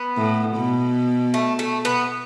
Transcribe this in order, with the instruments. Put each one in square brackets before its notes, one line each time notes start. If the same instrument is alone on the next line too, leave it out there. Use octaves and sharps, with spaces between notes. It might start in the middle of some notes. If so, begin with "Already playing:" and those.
Already playing: [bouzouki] B3
[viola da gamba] A2
B2
[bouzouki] A3
A3
B3